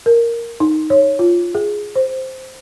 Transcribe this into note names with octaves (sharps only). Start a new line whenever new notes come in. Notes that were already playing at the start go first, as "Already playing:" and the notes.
A#4
D#4
C#5
F4
G#4
C5